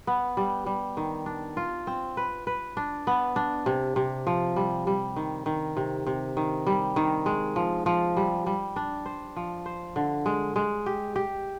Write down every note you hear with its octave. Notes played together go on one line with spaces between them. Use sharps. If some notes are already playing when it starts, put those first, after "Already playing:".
B3
G3
G3
D#3
D4
F4
C4
B4
B4
D4
B3
D4
C3
C3
F3
G3
G3
D#3
D#3
C3
C3
D#3
G3
D#3
G#3
F3
F3
G3
G3
D4
C5
F3
C5
D3
G#3
G#3
G4
G4